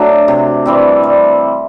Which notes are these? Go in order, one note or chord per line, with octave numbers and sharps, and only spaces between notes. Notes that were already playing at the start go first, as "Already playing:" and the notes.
Already playing: F#3 A3 D4
C3
E3 G3 C4
G3